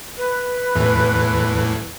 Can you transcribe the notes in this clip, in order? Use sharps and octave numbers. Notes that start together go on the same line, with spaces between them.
B4
E2 A2 E3